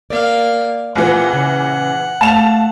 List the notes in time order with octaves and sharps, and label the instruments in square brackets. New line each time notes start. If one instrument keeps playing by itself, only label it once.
[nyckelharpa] A#3 F5 [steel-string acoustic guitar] D5
[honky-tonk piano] A#1 E3 [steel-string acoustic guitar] C4 F4 [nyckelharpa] F#5
[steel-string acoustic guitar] C#3
[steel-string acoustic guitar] A3 F5 [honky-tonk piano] A5 E7 F7